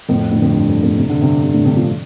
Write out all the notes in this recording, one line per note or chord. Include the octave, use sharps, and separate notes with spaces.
F2 A2
A2 D3
F2
G2
G2
F2 A2
C3
D3
G2 C3
G2 C3
A2 D3
G2 C3
C3 F3